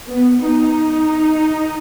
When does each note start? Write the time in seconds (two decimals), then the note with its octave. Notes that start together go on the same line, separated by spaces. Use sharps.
0.08 B3
0.48 D#4